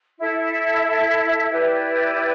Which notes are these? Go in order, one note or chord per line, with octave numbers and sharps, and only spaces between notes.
E4 A4 E5
E4 G4 B4 D5